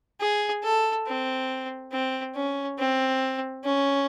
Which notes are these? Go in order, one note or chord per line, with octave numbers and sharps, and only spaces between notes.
G#4
A4
C4
C4
C#4
C4
C#4